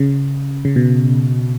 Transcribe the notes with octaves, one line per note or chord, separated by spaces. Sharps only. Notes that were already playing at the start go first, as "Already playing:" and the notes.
Already playing: C#3
C#3
B2